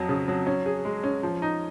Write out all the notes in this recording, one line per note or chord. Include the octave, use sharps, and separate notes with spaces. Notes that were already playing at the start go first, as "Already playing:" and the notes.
Already playing: F2 F#3
C#3
F#3
C#4
G#4
G#3
C#4
F3
D#4